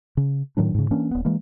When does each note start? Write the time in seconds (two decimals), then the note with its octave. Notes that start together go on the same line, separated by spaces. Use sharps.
0.17 C#3
0.57 A2 D#3 F#3 D4
0.74 G#2 C#3
0.91 E3 A#3 C#4 D4
1.11 D#1 B3
1.25 E3 G#3 A#3